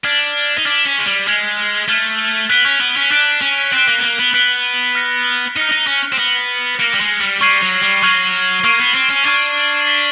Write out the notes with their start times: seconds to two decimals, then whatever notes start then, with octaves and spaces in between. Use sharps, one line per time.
0.04 D4 F6 G#6 B6
0.58 D#4
0.65 D4 F6 G#6 B6
0.87 C#4
0.99 G#3
1.06 G3
1.27 G#3 F6 G#6 B6
1.88 A3 F6 G#6 B6
2.49 B3 F#6 B6 D7 G7
2.65 C#4
2.81 B3
2.97 C#4
3.11 D4 F#6 B6 D7 G7
3.41 C#4
3.72 C4 F#6 B6 D7 G7
3.87 A#3
3.98 B3
4.03 A#3
4.19 B3
4.34 B3 F#6 B6 D7 G7
4.95 F6 A#6 C#7
5.56 D#4 F6 A#6 C#7
5.72 D#4
5.87 C#4
6.13 C4
6.18 B3 F6 A#6 C#7
6.80 A#3 F6 A#6 C#7
6.94 G3
7.01 G#3
7.21 G3
7.41 G3 C#6 F6 G#6 C7 D#7
7.62 F#3
7.82 G3
8.02 F#3 C#6 F6 G#6 C7 D#7
8.64 A#3 C#6 F6 G#6 C7 D#7
8.80 B3
8.95 C4
9.10 C#4
9.26 D4 C#6 F6 G#6 C7 D#7
9.87 G#6 B6 E7 G7